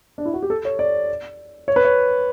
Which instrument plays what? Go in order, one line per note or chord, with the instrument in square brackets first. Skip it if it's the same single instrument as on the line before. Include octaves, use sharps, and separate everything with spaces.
[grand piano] D4
E4
F#4
G4
A4
C#5
D5
C#5
B4
C#5